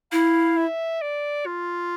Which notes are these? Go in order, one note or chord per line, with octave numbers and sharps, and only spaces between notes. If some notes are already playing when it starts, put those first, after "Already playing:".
E4 F5
E5
D5
F4